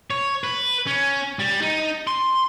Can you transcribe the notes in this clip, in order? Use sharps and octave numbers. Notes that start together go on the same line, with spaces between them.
C#5
B4
C#4
G3
D#4
C6